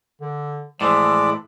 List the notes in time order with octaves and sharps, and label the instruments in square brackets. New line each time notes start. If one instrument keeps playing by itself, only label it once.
[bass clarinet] D3
[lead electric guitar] A2 E3 [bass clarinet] F3 [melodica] G#3 D5